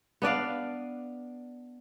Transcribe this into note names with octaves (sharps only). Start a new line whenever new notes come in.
B3 D4 D5 F5